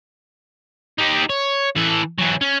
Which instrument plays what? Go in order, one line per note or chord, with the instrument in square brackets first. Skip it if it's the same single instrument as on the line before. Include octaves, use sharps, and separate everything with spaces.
[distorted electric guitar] D#4 G4
C#5
E3 A4
E3 F#3
C#4